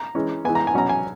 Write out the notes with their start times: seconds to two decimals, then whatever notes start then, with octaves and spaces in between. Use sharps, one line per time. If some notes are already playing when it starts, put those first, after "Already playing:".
Already playing: A#5
0.15 E3 G#3 C#4
0.45 E3 G#3 B3 G#5
0.55 A#5
0.67 G#5
0.74 B2 F#3 C#4 A#5
0.89 G#5